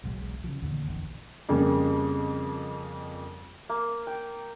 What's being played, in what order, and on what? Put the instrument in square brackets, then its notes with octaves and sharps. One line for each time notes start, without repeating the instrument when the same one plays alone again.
[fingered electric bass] E1 B1 G#3
C#3 E3 F3
E2 A#2 D3 D#3
F1 A#1 E2 D3
[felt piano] F2 C#3 G3 A#3
[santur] A#3
G5